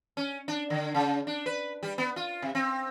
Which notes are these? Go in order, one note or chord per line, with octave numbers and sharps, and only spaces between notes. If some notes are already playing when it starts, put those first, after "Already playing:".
C#4
D4
D3
C#3
D4
B4
G3
B3
F4
C3
C4